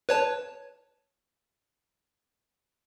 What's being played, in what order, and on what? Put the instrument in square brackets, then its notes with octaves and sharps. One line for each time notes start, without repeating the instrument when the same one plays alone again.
[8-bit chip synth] B4 C#5 A5